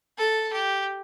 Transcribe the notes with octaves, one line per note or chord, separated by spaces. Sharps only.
A4
G4